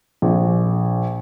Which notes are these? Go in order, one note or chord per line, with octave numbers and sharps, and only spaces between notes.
A#1